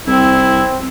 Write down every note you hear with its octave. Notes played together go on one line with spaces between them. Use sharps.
C2 C4 E4